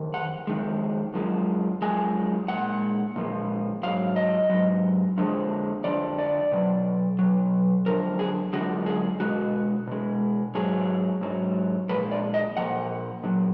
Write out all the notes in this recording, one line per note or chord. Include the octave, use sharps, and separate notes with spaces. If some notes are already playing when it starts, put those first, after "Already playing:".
Already playing: F2 D#3
F#5
F2 D#3 G#3
F#2 F3 G#3
F#2 F3 G#3 G#5
A#2 F3 G#3 F#5
A#2 F3 G#3
G#2 F#3 F5
D#5
G#2 F#3
F2 D3 F3 G#3
F2 D3 F3 D5
D5
B2 F#3
B2 F#3
F#2 D3 F3 A#4
G#4
F#2 D3 F3 G#3 F#4
G#4
B2 G#3 F#4
B2 G#3
G#2 F#3 G#4
G#2 F#3
A#2 F3 G#3 B4
D5
D#5
A#2 F3 F#5
A#2 F#3